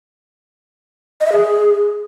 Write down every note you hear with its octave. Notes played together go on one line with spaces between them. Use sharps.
D#5
E5
G#4